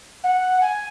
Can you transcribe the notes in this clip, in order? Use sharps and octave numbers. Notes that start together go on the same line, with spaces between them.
F#5
G#5